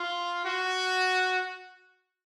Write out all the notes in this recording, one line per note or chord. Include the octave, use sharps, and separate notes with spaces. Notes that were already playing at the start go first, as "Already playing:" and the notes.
Already playing: F4
F#4